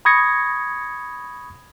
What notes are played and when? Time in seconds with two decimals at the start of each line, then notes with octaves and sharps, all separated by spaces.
0.05 B5 C#6 D#6 G#6 A#6 C#7